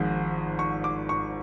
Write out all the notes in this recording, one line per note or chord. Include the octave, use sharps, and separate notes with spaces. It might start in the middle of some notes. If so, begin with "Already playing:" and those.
Already playing: G#1 G#2 F3 G#3
C#6
D6
C#6